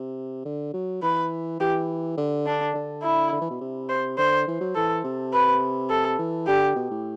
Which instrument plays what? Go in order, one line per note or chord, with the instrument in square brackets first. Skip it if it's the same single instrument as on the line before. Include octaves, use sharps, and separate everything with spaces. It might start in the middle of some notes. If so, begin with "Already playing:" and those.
Already playing: [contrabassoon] C3
D3
F#3
[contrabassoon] E3 [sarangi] B4
[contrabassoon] E3 [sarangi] G4
[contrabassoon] D3
[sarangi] D4
[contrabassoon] D3
[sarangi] E4
[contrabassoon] D3
E3
B2
C3
[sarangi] C5
[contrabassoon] D3 [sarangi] C5
[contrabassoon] E3
F#3
[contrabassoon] E3 [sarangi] A4
[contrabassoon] C3
[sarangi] B4
A4
[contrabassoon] E3
[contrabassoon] D3 [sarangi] G4
[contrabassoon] B2
A2